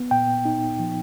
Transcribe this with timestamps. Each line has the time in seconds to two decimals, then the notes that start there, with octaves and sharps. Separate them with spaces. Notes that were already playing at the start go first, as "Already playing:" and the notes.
Already playing: B3
0.11 A#2 G5
0.45 D#4
0.79 F3